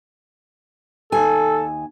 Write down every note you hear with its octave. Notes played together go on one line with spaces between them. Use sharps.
D#2 A4 G#5